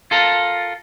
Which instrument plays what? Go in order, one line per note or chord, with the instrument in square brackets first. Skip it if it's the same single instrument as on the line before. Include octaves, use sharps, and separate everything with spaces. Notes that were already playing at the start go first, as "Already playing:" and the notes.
[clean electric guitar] F4 A4 A#4